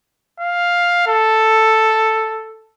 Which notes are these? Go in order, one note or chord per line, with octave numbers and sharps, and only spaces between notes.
F5
A4